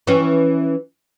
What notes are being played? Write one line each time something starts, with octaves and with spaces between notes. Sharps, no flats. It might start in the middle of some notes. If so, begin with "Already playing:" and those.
E3 C#4